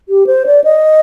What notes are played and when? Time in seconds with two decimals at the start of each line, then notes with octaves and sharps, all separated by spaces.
0.09 G4
0.27 C5
0.46 D5
0.64 D#5